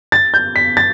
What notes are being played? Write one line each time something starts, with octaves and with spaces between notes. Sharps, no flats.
A6
G6
B6
A6